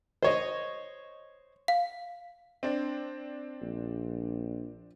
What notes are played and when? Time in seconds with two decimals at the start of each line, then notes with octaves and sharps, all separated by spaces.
0.23 C5 C#5 D#5
1.68 F5
2.63 C4 D4
3.61 A#1